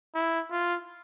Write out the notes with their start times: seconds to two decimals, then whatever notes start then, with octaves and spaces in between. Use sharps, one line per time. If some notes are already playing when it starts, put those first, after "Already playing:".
0.15 E4
0.51 F4